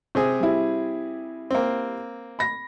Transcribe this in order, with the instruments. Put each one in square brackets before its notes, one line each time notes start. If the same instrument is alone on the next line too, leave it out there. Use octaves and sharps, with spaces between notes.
[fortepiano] C3 C4 G#4
[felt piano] G3 E4
[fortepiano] A#3 C4
[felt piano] B5 A#6